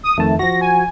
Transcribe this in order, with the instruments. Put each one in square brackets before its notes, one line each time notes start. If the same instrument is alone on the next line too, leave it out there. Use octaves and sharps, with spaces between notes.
[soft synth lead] D#6
[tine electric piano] F2 D#3 A5 [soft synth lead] A3
[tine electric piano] F3 F#4 [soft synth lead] A#6
[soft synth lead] G#5